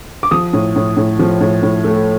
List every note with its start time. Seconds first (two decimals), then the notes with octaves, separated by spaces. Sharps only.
0.23 D6
0.31 F3 D#6
0.53 A2
0.76 A2
0.97 A2
1.19 F3
1.41 A2
1.63 A2
1.84 A3